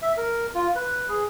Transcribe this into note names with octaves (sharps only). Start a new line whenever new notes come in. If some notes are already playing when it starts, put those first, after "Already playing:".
E5
A#4
F4
B4
G#4